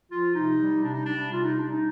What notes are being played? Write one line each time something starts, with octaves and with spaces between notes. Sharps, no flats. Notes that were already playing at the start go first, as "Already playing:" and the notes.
F3 F4
C3 D#4
G3
C3 D4
D#4
G3 D4
C3 F4
D#4
G3 D4
D#4